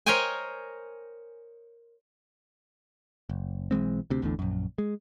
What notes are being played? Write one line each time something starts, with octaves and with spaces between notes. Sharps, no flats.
A#4 C5 C#5 D#5 G5 G#5
F#1
B1 E3 G#3 C4
D2 C3
A1 E2 A2 D3
A#1 F#2
G#3